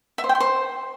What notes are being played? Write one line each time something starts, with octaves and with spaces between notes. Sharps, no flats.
E5
C5
G5
C6
C5